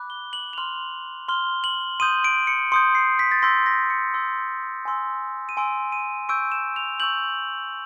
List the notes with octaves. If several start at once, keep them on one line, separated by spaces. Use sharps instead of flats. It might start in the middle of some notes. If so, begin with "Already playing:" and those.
Already playing: B5 D6 F#6
G7
F#7
F7
C6 F6 F#7
C6 F6 G7
F#7
C6 D#6 G6 D#7
D7
C#7
C6 D#6 G6 C#7
C7
B6
A6
C6 E6 G6 A#6
A#6
C#7
C6 E6 G6
G#5 C6 E6
D#7
G#5 C6 E6 D7
D#7
C#6 E6 G6 D7
E7
F7
C#6 E6 G6 F#7